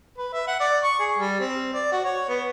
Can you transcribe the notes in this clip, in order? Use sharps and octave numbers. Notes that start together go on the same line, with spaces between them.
B4
E5
F#5
D5
C#6
G#4
G3
C4
D5
F#4
C#5
B3